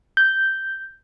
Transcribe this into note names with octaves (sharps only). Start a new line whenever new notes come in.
G6